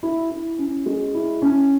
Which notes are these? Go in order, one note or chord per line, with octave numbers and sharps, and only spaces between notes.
E4
E4
C#4
G#3
E4
C#4